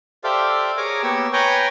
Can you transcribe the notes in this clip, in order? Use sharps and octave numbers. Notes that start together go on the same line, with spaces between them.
G4 A4 C5 D5 E5 F5
G#4 A#4 C#5 G#5 A#5 D6
A#3 B3 G4 C#5 E6
B4 C#5 G5 G#5 A#5